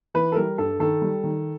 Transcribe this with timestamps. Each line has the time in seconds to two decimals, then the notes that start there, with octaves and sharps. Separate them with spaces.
0.14 E3 B4
0.32 A4
0.36 G3 A#4
0.58 G2 A4
0.80 D#3 A4
1.02 G3
1.24 D#3